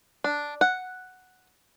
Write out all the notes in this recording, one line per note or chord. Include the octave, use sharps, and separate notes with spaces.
D4
F#5